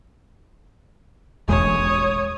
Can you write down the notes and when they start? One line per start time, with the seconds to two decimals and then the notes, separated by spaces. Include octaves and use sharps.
1.48 E1 A1 G#3 C#5 D#6